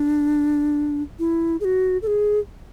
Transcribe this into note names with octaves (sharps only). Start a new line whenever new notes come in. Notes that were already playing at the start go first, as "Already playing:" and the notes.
Already playing: D4
E4
G#4
F#4
A4
G#4